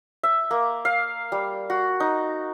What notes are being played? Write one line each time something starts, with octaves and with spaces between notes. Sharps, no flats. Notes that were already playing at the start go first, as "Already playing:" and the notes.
E5
A#3
F5
G3
F#4
D#4